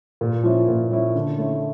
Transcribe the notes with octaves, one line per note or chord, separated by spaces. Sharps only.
A#2
F3 C#4 E4
A#2
F3 C#4 E4
D3
A3 C#4 E4